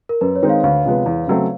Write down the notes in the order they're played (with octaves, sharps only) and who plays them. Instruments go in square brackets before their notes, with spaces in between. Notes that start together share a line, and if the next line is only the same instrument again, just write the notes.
[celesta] A#4
[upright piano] F#2 [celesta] B4
[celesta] C#5
[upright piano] D#3 G#3 C4 D#4
[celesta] F5
[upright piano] D2 [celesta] F5
[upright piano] C3 F3 G#3 B3
E2
C#3 F#3 A3 C4